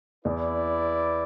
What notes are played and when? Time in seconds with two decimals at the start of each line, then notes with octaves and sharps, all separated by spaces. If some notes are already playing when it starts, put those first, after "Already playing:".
0.25 E2 E4 B4 D5